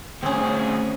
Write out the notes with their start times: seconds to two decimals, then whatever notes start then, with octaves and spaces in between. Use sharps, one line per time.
0.22 D2 C4 C#4 G#4